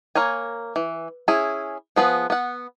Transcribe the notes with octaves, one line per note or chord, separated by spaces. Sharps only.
A#3 A#4 C#5 G#5
E3
C#4 E4 G#4
F3 B3 G#4 B4
B3 F#5